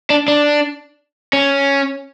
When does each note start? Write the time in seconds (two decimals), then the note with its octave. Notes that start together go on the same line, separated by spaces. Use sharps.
0.10 D4
0.28 D4
1.33 C#4